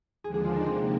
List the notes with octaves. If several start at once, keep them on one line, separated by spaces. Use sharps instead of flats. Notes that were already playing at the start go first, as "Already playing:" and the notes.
D#2 D3 F3 G#3 D4 G#4
G#4
F4
D#4
C3 F3 A#3 C4